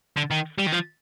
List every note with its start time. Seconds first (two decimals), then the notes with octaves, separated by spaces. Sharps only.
0.17 D3
0.31 D#3
0.59 G3
0.67 D#3
0.73 F3